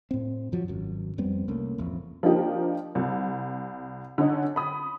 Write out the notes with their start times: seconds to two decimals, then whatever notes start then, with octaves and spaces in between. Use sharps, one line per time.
0.11 A2 C4
0.52 F#2 F3 F#3
0.68 G#1 F#2
1.18 F2 G3 B3 C4
1.48 C2 A3 A#3 C#4
1.78 E1 A1 F2
2.23 F3 A#3 D4 D#4 G4
2.95 C2
4.18 D3 C#4 D#4
4.56 B5 D#6